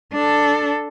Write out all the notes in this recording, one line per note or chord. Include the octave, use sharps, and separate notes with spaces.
D4 A4